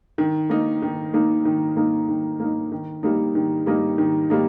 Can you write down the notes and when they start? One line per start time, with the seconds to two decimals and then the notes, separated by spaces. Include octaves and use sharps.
0.18 D#3
0.50 A#3 D#4
0.82 D#3
1.14 A#3 D#4
1.45 D#3
1.76 A#3 D#4
2.09 D#3
2.40 A#3 D#4
2.72 D#3
3.03 G3 A#3 D#4
3.35 D#3
3.66 G3 A#3 D#4
3.98 D#3
4.30 G3 A#3 D#4